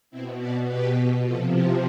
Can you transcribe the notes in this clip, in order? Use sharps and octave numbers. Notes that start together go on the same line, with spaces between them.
B2 C4 E4
B4 D5
G4 B4
C3 F3 F4 A4
E4 G4